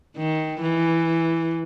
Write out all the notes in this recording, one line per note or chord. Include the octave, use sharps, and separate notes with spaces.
D#3
E3